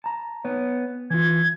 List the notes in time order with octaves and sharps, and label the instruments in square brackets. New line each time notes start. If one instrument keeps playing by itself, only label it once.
[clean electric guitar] A5 A#5
B3 C#5
[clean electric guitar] E3 F4 [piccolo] G#6